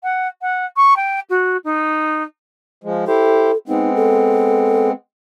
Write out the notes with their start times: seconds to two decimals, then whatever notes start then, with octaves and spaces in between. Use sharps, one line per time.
0.03 F#5
0.42 F#5
0.76 C#6
0.96 G5
1.30 F#4
1.64 D#4
2.84 F3 G#3
3.07 E4 G4 A4 C5
3.68 G#3 B3 C4 D#4
3.95 A4